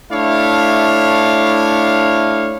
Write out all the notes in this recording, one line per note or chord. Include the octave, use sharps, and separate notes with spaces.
A3 D4 E4 C#5 F5